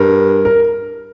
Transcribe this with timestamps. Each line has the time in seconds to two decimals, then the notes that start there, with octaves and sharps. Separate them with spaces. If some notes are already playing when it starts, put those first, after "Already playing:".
Already playing: G2 A#4
0.45 A#4